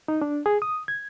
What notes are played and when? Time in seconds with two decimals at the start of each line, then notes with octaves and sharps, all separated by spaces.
0.08 D#4
0.22 D4
0.46 G#4
0.62 D#6
0.88 G#6